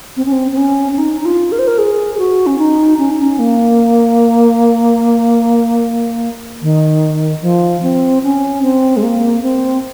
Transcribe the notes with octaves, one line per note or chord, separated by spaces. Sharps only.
C4
C#4
C4
C4
C#4
C#4
D#4
D#4
F4
A#4
C5
A#4
G#4
F#4
C#4
D#4
C#4
D#4
C#4
A#3
D#3
F3
C4
C#4
C4
G#3
A#3
C4